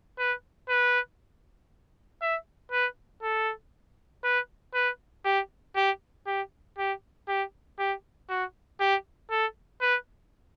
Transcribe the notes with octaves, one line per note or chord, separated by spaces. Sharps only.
B4
B4
E5
B4
A4
B4
B4
G4
G4
G4
G4
G4
G4
F#4
G4
A4
B4